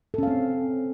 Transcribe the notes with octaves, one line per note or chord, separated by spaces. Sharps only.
C4 C#4 A4 F5